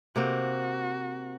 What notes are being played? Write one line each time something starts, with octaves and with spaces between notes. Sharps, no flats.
C3 A#3 C4 F#4